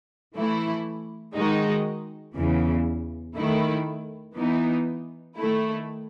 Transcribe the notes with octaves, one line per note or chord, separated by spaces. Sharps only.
E3 A3 E4
D#3 G#3 D#4 F#4
E2 C#3 E3
D#3 A3 E4
E3 B3 D#4
D#3 A3 E4